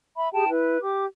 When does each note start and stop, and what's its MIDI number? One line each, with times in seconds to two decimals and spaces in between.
0.16 0.29 76
0.16 0.29 83
0.32 0.49 67
0.32 0.49 68
0.32 0.49 79
0.32 0.49 81
0.50 0.77 64
0.50 0.77 71
0.82 1.06 67
0.82 1.06 86